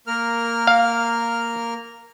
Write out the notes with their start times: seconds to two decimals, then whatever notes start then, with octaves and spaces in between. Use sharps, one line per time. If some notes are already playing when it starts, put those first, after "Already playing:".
0.07 A#3 A#4 F6
0.67 F5